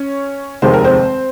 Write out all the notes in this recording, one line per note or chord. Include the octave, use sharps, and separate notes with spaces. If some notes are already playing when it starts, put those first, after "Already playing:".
Already playing: C#4 C#5
F1 D#2 D#3 G#3 C5
A#4
C4 C5